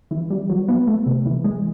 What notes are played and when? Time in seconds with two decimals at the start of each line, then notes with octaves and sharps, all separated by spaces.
0.11 E3
0.30 G3
0.50 F#3
0.68 B3
0.87 A3
1.06 C3
1.25 E3
1.44 G#3